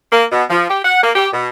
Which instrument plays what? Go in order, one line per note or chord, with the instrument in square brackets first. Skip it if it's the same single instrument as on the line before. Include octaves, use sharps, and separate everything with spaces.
[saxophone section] A#3
B2
F3
G4
F#5
A#3
G4
B2